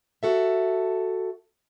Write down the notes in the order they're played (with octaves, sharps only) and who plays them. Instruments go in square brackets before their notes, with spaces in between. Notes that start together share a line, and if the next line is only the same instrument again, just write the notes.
[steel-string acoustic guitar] F#4 A4 E5